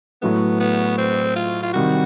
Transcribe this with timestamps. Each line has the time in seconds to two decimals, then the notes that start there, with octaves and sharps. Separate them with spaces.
0.22 A2 F#3 A3 B3
0.60 B3
0.98 C4
1.36 F4
1.62 F4
1.74 C3 D#3 G3 F#4